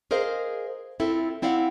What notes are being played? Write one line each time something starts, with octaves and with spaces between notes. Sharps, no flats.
G#4 A#4 C5 D#5 F5
C4 E4 F4 A4
C4 E4 D5 F5 F#5